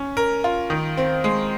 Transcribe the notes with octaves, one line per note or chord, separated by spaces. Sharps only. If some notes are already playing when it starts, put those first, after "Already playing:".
Already playing: C#4
A#4
F4
D#3
C4
G#3